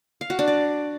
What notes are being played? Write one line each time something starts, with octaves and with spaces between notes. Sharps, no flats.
F5
F#4
D4
D5